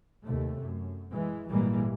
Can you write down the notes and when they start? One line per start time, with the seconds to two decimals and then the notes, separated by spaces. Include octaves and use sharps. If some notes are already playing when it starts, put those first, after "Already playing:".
0.23 D#2 C3 A3
0.59 F#2
1.11 E3 G#3
1.49 G#1 A#2 E3 G3 G#3 A#3